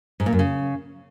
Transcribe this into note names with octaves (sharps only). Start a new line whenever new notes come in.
G#2
A#2
F#2
C#3